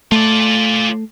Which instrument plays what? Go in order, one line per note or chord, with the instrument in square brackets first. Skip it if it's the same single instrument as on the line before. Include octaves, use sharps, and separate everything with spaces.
[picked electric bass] A3 [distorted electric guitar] F4 D5